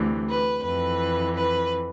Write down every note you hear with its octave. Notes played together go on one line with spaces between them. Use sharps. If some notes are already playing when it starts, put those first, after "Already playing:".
Already playing: D2 C3 E3
B4
F2 E3 B4
B4